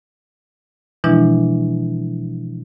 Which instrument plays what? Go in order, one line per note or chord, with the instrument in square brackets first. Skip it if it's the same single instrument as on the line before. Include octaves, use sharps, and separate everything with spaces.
[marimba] B2 E3 F3 G#3 D4 E4